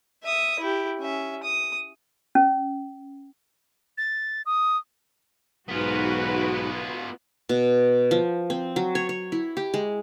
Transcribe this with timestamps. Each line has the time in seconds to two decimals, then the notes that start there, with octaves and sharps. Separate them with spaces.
0.24 E5 D#6
0.60 E4 G4
1.00 C#4 E5
1.43 D#6
2.35 C#4
3.98 A6
4.46 D#6
5.69 B1 G#2 B3 F4 F#4 B4
7.49 B2
8.11 F3
8.50 C4
8.76 F#3
8.95 C#5
9.09 C#5
9.32 E4
9.57 G4
9.74 G#3